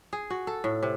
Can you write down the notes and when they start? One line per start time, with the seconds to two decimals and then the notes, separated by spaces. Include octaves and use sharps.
0.13 G#4
0.30 F#4
0.47 A4
0.64 A2
0.82 C3